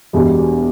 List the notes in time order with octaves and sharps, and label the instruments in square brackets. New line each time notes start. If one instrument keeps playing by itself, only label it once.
[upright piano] E1 E2 B2 G3